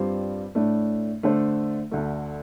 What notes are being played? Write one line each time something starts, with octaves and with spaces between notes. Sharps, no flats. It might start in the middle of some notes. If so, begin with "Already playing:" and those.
Already playing: G2 G3 C4 F4 C5
A2 A3 D4
D3 A3 D4 A4 C5
D2 D3 A3